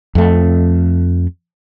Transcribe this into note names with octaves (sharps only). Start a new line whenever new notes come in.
F2 A3